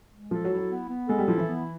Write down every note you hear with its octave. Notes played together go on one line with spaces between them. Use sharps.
G#3
F3 A4
F#3
E4
F#3
B3
B3
G#3 A4
G3
F3 E4
E3
B3